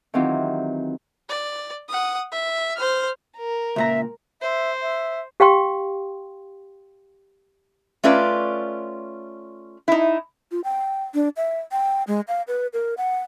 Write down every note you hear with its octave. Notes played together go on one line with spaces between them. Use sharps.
D#3 E3 F#3 C4 F4 G4
D5
F#5 D#6
E5
C5 F6
A#4
C#2 A#2 E5 A#5
C5 E5
E5
G4 F5 G5 C6
A3 C#4 F4 B4 D5
D#4 E4
F4
G5
D4
E5
G5
G#3
F5
B4
A#4
F#5